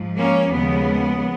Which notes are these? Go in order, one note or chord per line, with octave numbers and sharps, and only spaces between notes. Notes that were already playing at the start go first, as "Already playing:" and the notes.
Already playing: G#2 F3
A#3 C#4
D#2 C#3 F3 G#3 B3